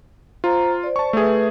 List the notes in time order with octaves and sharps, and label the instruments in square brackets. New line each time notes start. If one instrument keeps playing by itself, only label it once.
[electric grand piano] F4 [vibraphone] C5 A#5
[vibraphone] C5 D5
[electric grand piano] A5 C#6
[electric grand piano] A3 G#4 [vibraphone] B4 E5